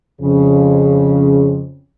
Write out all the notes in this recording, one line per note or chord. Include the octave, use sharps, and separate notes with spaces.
F2 C#3